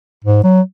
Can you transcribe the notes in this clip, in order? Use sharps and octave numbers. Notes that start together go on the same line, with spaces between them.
G#2
F#3